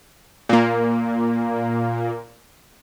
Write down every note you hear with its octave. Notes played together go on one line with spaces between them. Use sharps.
A#2 A#3